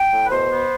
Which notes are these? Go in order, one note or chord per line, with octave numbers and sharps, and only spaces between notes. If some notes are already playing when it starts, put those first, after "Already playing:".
Already playing: G5
A2
B4
B2 C5
B3